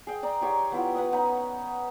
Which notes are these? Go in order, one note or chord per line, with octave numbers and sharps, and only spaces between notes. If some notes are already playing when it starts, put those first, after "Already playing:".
G#4 G5
D5 A#5 D6 D#6
D#4 G4 C#5 C6
B3 E4 F4
B4 F#5 G#5 D#6
B3 C#4 D#4